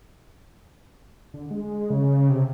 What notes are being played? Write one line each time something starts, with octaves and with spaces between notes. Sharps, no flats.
D3
G#3
C#3
C3